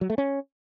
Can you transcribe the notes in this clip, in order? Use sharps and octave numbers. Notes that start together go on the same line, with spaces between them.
F#3
A3
C#4